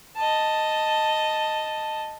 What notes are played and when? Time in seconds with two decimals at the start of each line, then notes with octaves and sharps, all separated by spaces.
0.16 D#5 A5